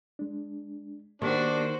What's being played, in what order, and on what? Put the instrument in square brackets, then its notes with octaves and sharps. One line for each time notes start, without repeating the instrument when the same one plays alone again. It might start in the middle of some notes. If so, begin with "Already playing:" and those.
[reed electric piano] G#3 D4
[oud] D#3 [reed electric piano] A#3 B3 G4 [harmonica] D4 [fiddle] F#4 C5